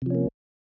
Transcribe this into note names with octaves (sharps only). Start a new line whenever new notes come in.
C3 F3 A#3 C#4